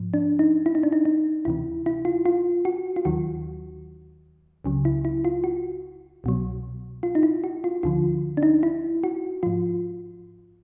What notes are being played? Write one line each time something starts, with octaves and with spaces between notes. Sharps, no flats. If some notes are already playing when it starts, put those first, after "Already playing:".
Already playing: G#2 F3
D4
D#4
E4
D#4
D4
D#4
D#4
D2 C3 E3 E4
E4
F4
F4
F#4
F4
D#2 D#3 F#3 F#4
C#2 C#3 F#3
E4
E4
F4
F#4
C2 B2 F#3
F4
D#4
E4
F#4
F4
D2 D3 F3 F4
D4
D#4
E4
F#4
G#2 F3 F4